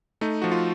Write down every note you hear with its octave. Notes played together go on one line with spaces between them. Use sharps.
A3 D#4
F3 F#4
F4